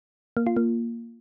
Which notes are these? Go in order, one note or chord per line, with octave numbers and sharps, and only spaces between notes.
A#3
F4
A#3